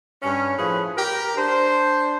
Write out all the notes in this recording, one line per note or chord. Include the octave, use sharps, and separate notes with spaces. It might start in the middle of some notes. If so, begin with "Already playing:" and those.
G2 C#4
A2 F3 G#4 B4
G4 A#4
D4 C5